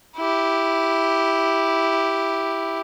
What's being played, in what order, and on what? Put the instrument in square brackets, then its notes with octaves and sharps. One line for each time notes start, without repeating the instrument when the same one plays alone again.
[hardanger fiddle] E4 G4